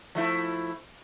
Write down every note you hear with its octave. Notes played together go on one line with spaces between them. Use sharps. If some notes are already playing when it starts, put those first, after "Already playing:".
F3 A3 E4